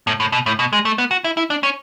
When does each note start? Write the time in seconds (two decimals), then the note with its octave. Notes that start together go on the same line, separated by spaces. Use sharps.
0.07 A2
0.20 A2
0.32 B2
0.46 A2
0.59 B2
0.73 G#3
0.85 A3
0.98 B3
1.11 F#4
1.24 E4
1.37 E4
1.50 D4
1.63 C#4